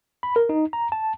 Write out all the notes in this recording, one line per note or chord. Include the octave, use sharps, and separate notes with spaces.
B5
A#4
D#4
A#5
A5